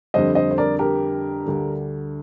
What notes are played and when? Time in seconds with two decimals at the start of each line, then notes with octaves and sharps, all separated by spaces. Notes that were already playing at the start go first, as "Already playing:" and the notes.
0.14 F2 D3 G3 C5 D#5
0.35 C5 D#5
0.51 C5
0.58 A#4 D5
0.79 G4 A#4
1.46 D2 D3 G3